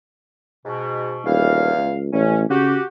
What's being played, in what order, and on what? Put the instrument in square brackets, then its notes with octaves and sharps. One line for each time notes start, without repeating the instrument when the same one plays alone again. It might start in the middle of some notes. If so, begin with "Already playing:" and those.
[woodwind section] G#2 B2
[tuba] D#1 [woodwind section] E2 F5
[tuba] C#2
[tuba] A1 [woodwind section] C#4
[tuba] C#3 [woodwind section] F#4 G4